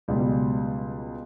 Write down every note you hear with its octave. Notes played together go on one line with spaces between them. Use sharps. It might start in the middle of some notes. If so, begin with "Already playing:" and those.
C#2 B2 F#3 G3